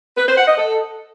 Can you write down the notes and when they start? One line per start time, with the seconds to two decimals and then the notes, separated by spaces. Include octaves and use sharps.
0.17 B4
0.27 C5
0.37 F#5
0.47 D#5
0.57 A4